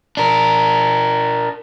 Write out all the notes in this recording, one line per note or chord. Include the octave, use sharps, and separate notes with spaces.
D4 A#4